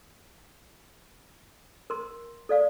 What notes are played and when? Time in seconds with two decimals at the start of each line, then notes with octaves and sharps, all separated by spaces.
1.90 A#4 C6
2.49 A4 D5 F5